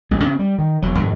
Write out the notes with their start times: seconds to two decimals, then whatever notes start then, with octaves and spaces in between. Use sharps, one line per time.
0.11 A1 G#3
0.24 C#3 C4
0.39 G3
0.58 D#3
0.82 E1 F#3
0.99 F2 G#2 C3 D#3